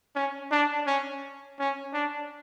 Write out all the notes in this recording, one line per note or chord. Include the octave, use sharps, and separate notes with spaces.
C#4
D4
C#4
C#4
D4